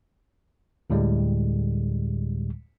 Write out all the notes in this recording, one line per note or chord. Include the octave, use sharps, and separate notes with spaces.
D2 A2 D3 G3 G#3